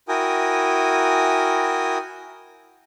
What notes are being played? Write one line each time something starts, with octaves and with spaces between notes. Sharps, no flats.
E4 F#4 A#4 G5 G#5 D#6